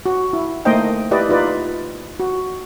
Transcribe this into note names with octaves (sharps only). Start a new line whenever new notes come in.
F#4
E4
A3 A#3 D#4 C5 D#5 G5
E4 G4 B4 D5 D#5
D#4 F4 B4 D5
F#4